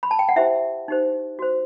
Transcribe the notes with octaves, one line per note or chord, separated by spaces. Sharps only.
B5
A5
G5
F#5
E4 G4 C5 E5
D#4 G4 C5
F#4 C5